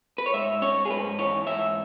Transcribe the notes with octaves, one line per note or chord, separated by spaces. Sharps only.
B4
C#5
G#2 E5
C#4 C#5
G#4
G#2 B4
E3 C#5
G#2 E5